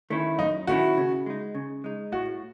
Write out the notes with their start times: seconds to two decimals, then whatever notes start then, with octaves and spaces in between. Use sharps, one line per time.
0.10 D#3 A3 C#4 E4
0.39 F#2 D#4
0.67 D#3 A3 C#4 E4 F#4
0.97 C#3
1.26 G#3 D#4
1.55 C#3
1.84 G#3 D#4
2.12 A2 F#4